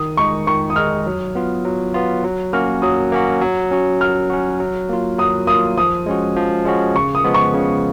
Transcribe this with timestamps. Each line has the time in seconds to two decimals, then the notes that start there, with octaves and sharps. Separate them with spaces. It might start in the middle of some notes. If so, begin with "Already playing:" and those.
Already playing: D#3 D#6
0.17 G#3 D#4 C#6
0.47 D#3 C#6
0.70 D#6
0.76 G#3 D#4 F6
1.06 F#3
1.35 B3 F4
1.65 F#3
1.94 B3 F4
2.24 F#3
2.53 A#3 C#4 F#4 F6
2.82 F#3 D#6
3.12 A#3 C#4 F#4
3.41 F#3
3.71 C#4 F#4
4.01 F#3 F6
4.30 C#4 F#4
4.60 F#3
4.89 A#3 F4
5.18 F#3 D#6
5.47 A#3 F4 D#6
5.78 F3 D#6
6.06 G#3 C#4 F#4
6.37 F3
6.65 G#3 C#4 F#4
6.95 C#3 C#6
7.15 D#6
7.24 F3 G#3 B3
7.34 C#6
7.54 C#3